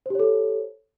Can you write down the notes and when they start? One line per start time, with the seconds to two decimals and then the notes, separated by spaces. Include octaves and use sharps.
0.06 C5
0.10 G4
0.15 C#5
0.19 A4